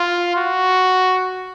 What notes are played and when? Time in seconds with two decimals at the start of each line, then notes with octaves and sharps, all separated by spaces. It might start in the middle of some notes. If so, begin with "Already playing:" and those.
Already playing: F4
0.36 F#4